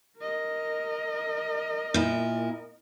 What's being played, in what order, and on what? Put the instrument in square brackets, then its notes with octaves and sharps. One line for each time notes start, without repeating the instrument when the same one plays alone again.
[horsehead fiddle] A#4 D#5
[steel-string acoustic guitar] A#2 E4